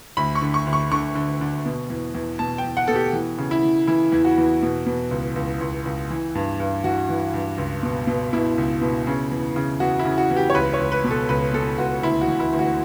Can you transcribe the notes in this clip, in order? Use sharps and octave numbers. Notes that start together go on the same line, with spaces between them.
D2 B5
C#6
D3
C#6
D2
C#6
D3 C#6
D3
D3
B2
E2
E2
B2 A5
G5
E2
F#5
B2 A4
G4
E3
C#3
E4
E3
E3 E4
E2
F#4
E2
B2
B2
C#2
C#2
C#2
C#2
E3
G2
G2
E3 F#4
E3
G2
C#2
B2
B2
B2 E4
C#2
B2
C#3
E2
C#3
E2 F#4
E4
C#3
F#4
E2
G4
C#5
C#2 B4
C#5
C#2
B4
B2
A4
C#2 B4
B2 A4
C#2 F#4
D2 E4
F#4
E3
E4
D2
F#4